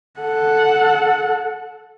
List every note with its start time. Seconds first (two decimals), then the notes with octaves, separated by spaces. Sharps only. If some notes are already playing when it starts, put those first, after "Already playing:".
0.20 A4 F#5